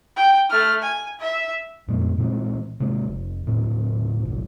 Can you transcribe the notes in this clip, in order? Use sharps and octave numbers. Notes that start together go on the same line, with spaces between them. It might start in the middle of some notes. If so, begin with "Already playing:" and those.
G5
A3 F6
G#5
E5
F2 A#2 G#3 B3
A#2 E3 G#3 C4
C3 G#3 A#3
F1
D#1 A2 C4
G1 C2